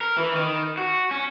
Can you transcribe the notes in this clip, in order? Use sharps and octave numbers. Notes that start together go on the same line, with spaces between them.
A#4
E3
D#3
F#4
C#4